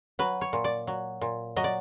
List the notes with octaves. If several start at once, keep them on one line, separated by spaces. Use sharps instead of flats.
F#3 B4
C#5
A#2
D5
F#3
A#2
F#3 D#5
D5